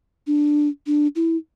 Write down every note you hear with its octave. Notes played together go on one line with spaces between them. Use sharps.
D4
D4
E4